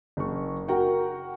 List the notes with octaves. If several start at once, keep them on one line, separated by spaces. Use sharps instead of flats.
F#1 C#6
F#4 A#4 F#5 G5